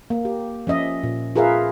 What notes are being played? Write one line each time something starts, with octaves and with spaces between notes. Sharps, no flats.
A#3
G4
F3 C#4 D#5 E5
A#2
F4 G#4 A#4 B4 E5 F5